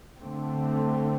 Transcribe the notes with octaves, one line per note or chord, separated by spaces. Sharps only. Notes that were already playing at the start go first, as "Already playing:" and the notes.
D3 A3 C4